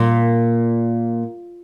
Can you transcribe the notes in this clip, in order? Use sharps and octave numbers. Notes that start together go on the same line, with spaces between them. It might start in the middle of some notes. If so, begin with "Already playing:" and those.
Already playing: A#2